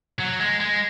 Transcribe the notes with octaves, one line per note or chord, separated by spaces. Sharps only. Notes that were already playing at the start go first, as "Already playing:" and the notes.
F#3
G#3
G#3